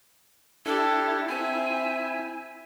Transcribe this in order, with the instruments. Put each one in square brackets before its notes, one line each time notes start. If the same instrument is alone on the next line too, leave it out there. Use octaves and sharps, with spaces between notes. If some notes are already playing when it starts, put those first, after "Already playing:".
[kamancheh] D4 G4 [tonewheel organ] E4 [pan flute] A4
[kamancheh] C4 E5 [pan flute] G#5